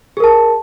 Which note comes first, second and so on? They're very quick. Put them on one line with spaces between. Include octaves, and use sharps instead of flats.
G#4 A#4 A5